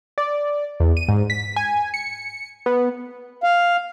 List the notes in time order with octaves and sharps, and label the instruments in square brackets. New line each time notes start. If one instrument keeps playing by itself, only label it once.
[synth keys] D5
E2
D#7
G#2
B6
G#5
C#7
B3
[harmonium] F5